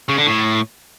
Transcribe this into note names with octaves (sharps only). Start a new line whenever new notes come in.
C#3
D3
A2